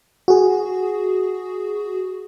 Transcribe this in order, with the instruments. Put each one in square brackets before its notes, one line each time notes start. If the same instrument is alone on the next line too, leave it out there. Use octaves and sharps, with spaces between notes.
[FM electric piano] F#4 G#4